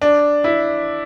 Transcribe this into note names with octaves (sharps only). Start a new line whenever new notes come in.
D4
E4